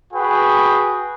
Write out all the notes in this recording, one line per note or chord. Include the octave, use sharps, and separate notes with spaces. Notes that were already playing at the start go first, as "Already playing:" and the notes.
F#4 G#4 B4 G5